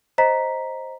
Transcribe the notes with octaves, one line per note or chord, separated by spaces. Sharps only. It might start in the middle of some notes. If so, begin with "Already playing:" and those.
C5 D#5 A#5 B6